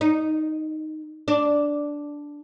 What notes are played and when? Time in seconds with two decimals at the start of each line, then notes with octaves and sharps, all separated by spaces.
0.01 D#4
1.28 D4